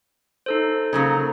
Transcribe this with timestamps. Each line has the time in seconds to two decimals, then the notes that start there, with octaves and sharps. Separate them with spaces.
0.46 D#4 A4 C5
0.93 C#3 F#3 A#3